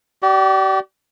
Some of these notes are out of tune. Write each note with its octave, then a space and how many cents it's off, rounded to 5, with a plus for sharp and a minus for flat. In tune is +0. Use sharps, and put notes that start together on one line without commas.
G4 -40 D5 +0